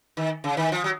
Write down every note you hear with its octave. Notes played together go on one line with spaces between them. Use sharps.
D#3
C#3
D#3
F3
F#3